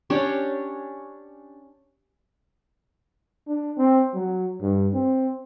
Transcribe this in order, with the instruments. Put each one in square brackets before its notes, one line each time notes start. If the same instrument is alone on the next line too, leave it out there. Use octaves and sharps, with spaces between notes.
[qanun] C#4 D4 G4 C#5
[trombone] D4
C4
F#3
G2
C4